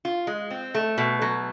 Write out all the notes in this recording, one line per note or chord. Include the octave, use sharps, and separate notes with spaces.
F4
G#3
C4
A3
B2
F#3